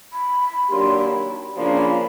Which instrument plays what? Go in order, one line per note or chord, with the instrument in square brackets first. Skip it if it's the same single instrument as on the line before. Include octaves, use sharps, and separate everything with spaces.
[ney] B5
B5
[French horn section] D#3 F#3 A#3 D4 G4 [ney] C6
[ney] B5
[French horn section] C#3 F3 A#3 D4 F4 [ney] B5